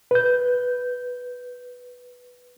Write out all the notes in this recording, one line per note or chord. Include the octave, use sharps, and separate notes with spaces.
B4 G6